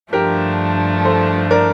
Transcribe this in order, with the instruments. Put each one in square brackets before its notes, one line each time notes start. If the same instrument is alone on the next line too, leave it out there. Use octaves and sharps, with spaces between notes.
[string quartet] G2 F3 A3 D4 [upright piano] G4 A#4
[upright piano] A4 C5
A#4 D5